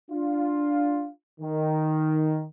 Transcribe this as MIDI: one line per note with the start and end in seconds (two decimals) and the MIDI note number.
0.11 1.11 62
0.11 1.11 65
1.41 2.45 51